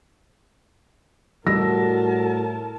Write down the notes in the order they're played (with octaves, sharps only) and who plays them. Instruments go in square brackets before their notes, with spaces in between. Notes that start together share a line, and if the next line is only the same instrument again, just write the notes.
[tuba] A2 [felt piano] G3 E6 A#6 [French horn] F#4 [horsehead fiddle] A#4 A5